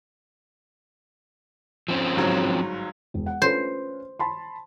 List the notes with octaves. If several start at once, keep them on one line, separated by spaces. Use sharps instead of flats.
F3 C4 C#4
G1 G#2 F#3
E1
F#5
C#4 F4 B4 C5
A5 B5 C6